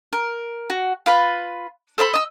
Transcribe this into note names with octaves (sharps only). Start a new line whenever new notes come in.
A#4
F#4
F4 B4 B5
A4 C5 E5 B5
D#5 E6